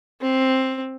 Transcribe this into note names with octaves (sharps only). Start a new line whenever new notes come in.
C4